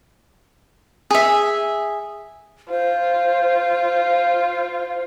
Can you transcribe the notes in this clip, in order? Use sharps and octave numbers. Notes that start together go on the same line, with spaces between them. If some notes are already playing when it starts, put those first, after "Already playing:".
G#4 E5
F4 C5